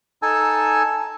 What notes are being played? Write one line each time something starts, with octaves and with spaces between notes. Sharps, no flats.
D#4 A4 G#5 A5 E6